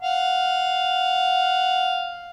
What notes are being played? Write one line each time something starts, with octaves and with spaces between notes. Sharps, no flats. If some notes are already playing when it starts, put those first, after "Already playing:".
F5 F#5